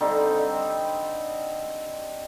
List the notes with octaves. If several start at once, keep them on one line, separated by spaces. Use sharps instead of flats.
D3 G3 C4 D#4